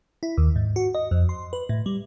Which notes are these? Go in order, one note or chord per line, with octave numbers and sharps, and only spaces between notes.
E4
D#2
G#2
F#4
D#5
F2
C6
B4
A2
G3